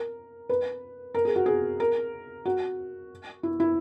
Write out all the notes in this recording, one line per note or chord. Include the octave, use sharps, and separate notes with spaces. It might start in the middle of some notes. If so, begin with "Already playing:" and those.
Already playing: A#4
B4
A#4
G#4
F#4
G#4
A#4
F#4
E4
E4